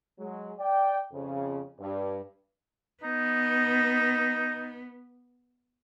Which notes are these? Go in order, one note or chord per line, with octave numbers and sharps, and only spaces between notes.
F#3 G#3
D5 G5
F2 C#3
G2
B3 D#4